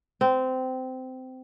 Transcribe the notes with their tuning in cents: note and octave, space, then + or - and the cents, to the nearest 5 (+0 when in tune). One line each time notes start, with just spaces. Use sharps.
C4 -20